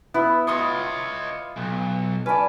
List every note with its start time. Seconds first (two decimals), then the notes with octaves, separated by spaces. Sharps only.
0.14 B3 E4 B5
0.47 F4 C#5 D#5 C6 D#6
1.57 B1
2.26 C#4 B4 D5 A5